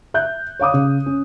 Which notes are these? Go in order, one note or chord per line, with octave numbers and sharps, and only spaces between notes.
E5 F#6 G6
C#5 F5 D6 D#6
C#3
C#4